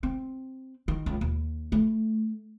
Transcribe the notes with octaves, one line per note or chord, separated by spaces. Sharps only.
C4
D#3
C#2
D#2
A3